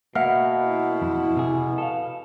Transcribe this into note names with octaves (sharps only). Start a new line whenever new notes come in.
B2 A#3 E5 F#5 F6
E4
F2
C3 G#4
A4 F5